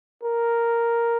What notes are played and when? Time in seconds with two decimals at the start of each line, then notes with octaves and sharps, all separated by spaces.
0.23 A#4